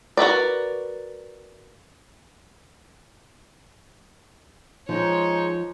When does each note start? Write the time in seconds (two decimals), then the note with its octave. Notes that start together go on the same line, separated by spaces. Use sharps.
0.17 F#4 A#4 B4 D5
4.89 F3 G#3 D#4 C#5